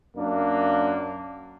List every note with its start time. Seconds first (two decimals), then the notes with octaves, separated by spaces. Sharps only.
0.16 F#2 A#3 D4